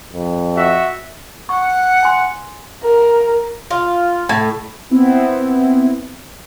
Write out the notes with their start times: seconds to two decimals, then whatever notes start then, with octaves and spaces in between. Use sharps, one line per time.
0.13 F2
0.56 F#4 E5
1.49 F#5 C#6
2.03 G#5 C6
2.83 A#4
3.71 F4
4.29 A2
4.90 B3 C4 E4